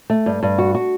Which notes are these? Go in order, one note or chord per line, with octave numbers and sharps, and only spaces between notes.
A3
G2
G2
F#4
F#4